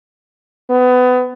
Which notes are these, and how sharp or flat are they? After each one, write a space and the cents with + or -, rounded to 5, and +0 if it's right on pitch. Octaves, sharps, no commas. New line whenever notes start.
B3 +25